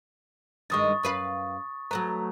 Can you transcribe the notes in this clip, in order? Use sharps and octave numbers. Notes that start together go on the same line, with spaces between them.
G2 D#3 G#3 C#6 D#6 A6
F#2 B4 F5
F#3 A3 B4 A#5